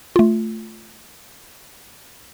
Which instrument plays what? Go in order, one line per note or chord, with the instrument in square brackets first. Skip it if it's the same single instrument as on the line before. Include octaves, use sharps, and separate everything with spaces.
[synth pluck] A3 F4